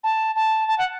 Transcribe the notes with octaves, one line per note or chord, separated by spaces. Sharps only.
A5
A5
A5
F#5